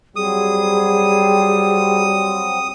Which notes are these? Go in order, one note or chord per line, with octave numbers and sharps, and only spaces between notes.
F#3 G3 C4 G#4 D#6